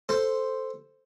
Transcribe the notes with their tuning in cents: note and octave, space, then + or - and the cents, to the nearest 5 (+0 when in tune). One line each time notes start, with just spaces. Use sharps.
A4 +0 C5 +0